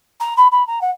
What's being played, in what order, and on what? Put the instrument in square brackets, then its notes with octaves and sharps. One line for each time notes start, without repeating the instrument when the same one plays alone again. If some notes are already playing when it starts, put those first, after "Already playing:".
[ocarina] A#5
B5
B5
A#5
F#5